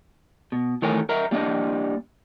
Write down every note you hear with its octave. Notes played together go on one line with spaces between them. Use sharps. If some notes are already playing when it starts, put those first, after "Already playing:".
B2
D#3 E3 A3 A#4 C#5 G#5
A#4 D#5 E5 A#5
G3 A#3 D4 D#5